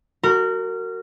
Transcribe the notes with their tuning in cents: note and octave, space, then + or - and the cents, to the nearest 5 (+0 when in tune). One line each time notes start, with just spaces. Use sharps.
F#4 +10 A#4 -25